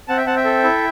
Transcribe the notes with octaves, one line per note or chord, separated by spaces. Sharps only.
C4 F#5 A5
E5 G5
C4 F#5 A5
E5 G5
A4
E4